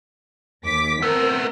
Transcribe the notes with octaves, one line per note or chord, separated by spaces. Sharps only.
D#2 D6 B6
A3 B3 C4 A#4